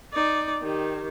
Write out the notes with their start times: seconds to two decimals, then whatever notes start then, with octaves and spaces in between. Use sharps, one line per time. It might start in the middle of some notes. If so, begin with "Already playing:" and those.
0.13 D#4 D5
0.62 D#3 G4